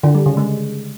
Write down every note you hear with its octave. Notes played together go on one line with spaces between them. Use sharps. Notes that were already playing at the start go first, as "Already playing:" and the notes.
D3
G3
C#3
G#3